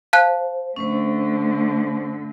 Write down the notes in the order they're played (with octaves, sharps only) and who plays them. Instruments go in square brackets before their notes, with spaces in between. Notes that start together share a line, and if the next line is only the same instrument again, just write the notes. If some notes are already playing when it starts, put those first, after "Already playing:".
[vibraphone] C5 [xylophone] F5 A5 F#6
[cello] D3 A3 [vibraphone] C#4 B4 C5